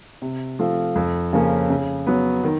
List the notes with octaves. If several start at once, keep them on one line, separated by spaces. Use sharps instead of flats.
C3
F3 A3 C4 F4
F2
C#3 F3 A#3 C#4
C#3
F#3 B3
D#3